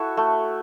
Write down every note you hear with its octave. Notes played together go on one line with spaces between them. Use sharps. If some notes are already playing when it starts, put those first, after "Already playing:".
Already playing: E4 F#4 A4
A3